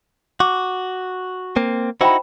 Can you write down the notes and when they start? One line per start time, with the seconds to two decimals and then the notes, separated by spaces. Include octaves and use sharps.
0.40 F#4 D6
1.56 A#3 C4
2.01 D#4 E4 F#4 C5 G5 B5